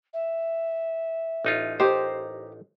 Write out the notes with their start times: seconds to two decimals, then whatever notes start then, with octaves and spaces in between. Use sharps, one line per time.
0.13 E5
1.45 A1 D#4 F4
1.80 G4 A#4 C5 D#5